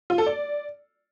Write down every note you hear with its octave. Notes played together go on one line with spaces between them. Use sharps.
F4
A4
D5